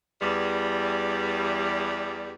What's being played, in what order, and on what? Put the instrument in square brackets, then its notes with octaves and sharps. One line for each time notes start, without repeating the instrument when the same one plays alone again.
[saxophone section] E2 G3